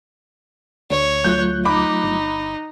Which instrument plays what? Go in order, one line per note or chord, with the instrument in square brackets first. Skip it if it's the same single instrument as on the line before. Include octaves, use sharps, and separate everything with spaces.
[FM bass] D2 [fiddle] C#5
[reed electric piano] F#3 A3 F4 [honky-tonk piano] F#6 G6
[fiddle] D#4 [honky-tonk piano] B5 D6
[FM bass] G1